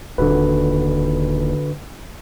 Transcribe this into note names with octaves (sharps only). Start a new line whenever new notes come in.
D#1 D3 F#4 B4